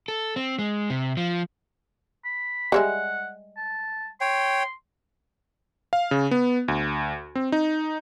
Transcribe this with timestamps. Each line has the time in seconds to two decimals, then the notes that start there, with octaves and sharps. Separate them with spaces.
0.08 A4
0.36 C4
0.59 G#3
0.90 C3
1.17 F3
2.25 B5
2.72 G3 G#3 E5 F#5
3.57 A5
4.21 C#5 G5 C6
5.93 F5
6.11 C#3
6.31 B3
6.68 D2
7.35 C4
7.52 D#4